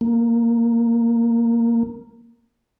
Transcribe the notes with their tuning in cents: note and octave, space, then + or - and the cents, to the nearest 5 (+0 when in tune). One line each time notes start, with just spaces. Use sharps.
A#3 -5